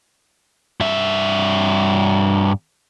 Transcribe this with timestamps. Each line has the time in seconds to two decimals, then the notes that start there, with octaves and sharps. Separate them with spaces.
0.80 G2 E5